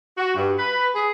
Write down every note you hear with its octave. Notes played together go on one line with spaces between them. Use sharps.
F#4
G2
B4
G#4